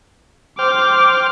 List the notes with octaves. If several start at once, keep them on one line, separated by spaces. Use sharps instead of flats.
C5 G5 D6 F6